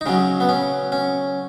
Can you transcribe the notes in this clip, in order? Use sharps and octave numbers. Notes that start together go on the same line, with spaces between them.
D#4
C#3 F#3 C#4
B3
C#4
C#4